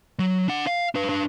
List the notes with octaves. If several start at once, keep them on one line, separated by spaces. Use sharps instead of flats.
F#3
D4 F#5
F5
D4 B4
D4 B4